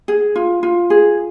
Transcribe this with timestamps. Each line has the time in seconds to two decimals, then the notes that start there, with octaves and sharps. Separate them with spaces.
0.08 G#4
0.36 F4
0.63 F4
0.90 G#4